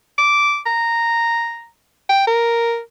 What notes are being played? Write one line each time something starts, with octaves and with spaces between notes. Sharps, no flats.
D6
A#5
G5
A#4